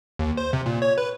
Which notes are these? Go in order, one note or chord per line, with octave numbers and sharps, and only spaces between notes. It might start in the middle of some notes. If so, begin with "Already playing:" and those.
D#2
C5
C3
A#2
C#5
B4